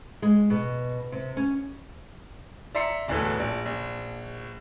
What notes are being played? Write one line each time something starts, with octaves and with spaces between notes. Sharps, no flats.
G#3
B2
C3
C#4
D5 E5 A#5 C6 C7 C#7
D1 E2 A2 B3 A4
A#1
A#1